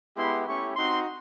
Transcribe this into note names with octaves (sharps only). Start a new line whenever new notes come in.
G#3 B3 E4 G4 C6
A3 C#4 E4 G4 C#6
C4 D#4 F#4 C6